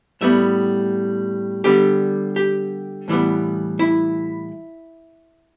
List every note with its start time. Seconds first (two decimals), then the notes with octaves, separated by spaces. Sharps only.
0.21 A2 G3 B3 E5
1.64 D3 G3 B3 G4
2.36 G4
3.08 A2 E3 G3 B3
3.79 E4